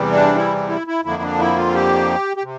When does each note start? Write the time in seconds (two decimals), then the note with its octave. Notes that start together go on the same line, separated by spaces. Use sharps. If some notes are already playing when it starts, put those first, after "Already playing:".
Already playing: E2 C3 E3 G3
0.12 D4
0.35 E4
0.69 E4
0.87 E4
1.05 F2 D3 F3 A#3 E4
1.22 D4
1.39 E4
1.56 F4
1.74 G4
2.37 G4
2.43 C3